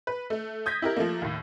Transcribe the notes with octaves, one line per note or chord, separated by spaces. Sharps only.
B4
A3
D#6 G6 G#6 A#6 B6
E4 G4 A#4
F3 A3 A#3
D#2 A2